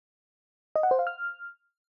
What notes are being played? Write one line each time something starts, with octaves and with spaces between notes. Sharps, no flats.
D#5
F#5
C5
F5
F6